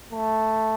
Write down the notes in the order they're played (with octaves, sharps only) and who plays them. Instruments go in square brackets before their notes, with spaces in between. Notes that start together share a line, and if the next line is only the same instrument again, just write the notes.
[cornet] A3